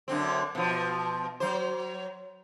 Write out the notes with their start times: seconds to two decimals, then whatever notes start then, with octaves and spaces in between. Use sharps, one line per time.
0.08 F#2 D3 C4
0.55 B2 F3
1.40 F#3 C5